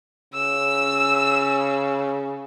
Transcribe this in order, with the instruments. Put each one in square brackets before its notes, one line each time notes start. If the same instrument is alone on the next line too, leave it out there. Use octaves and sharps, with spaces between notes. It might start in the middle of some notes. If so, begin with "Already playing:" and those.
[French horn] C#3 [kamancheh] E6